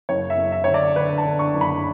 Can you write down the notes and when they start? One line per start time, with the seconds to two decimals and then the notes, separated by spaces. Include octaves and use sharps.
0.09 F#1 C#5
0.30 E5
0.37 F#1
0.52 E5
0.64 D3 C#5
0.74 D5
0.96 D3 B4
1.18 A5
1.25 D3
1.39 C#6
1.54 F#1
1.61 B5